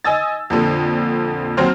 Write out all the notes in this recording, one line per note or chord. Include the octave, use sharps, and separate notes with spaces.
D#5 G#5 D#6 E6 A6
F2 A#2 D3
D#2 F#3 C4 C5 F6